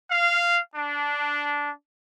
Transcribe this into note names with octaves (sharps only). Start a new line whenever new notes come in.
F5
D4